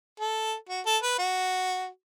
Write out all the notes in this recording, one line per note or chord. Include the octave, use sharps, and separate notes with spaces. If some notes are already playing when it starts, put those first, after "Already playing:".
A4
F#4
A4
B4
F#4